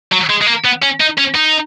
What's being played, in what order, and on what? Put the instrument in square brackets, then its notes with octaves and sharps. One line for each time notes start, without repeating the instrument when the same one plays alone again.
[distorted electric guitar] F#3
G#3
G#3
A#3
B3
C#4
D#4
C#4
D#4